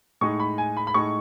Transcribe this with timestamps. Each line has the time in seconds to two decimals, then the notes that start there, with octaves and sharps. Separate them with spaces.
0.21 A2 G#3 D#4 C#6
0.40 B5
0.58 G#5
0.77 B5
0.87 B5
0.94 A2 G#3 D#4 C#6